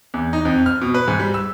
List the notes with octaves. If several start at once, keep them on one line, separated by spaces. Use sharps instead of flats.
E2
D#4
F2
F6
B2
B4
G#2
G3
E6